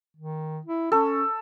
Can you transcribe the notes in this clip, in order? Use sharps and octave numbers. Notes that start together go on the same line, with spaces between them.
D#3
E4
C#4 A4